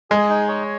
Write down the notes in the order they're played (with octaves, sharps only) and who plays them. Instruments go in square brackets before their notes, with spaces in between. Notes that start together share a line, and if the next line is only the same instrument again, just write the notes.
[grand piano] G#3 [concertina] G#4
[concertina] D#4
C#5